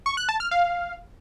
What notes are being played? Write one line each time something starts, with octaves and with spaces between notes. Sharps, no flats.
C#6
F#6
A5
F6
F5